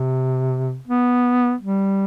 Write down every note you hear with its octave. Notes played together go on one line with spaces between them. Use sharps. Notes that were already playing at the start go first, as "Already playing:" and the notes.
Already playing: C3
B3
G3